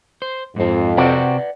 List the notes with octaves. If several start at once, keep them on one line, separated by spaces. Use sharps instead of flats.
C5
F2 G#2 C4
C3 C4 F#4 B4 D5 F#5